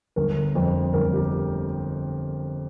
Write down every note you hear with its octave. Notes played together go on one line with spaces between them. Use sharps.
G1 A#4
F2
G1 A#4
G4